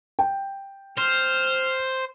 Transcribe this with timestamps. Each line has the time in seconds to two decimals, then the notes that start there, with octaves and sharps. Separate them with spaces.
0.19 G5
0.98 C5 F6